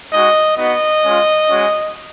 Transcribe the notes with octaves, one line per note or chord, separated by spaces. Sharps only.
G#3 D#4 F#4 D#5
B3 D#4 F#4 D#5
G#3 C#4 F4
G#3 C#4 F#4